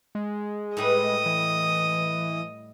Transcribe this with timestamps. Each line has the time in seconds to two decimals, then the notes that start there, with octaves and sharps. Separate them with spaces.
0.15 G#3
0.77 A2 G3 B4 D#5 D#6
1.26 E3